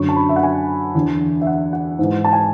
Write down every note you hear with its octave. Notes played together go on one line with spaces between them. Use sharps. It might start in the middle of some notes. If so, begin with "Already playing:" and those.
Already playing: F#2 D3 C#6
A5
B5
E5
F#5
G#5
E2 D3
E5
F#5
F#5
G#2 E3
A5
G#5